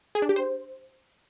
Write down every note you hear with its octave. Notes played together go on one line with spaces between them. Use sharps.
G#4
D4
G4
C5